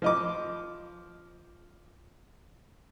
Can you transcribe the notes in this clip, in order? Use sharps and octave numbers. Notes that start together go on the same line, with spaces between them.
F3 D#5 D6